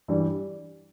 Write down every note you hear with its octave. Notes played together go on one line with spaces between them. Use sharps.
G2 E3 G3